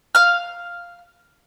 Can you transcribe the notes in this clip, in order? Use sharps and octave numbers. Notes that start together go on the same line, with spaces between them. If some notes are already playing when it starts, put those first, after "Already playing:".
F5 F6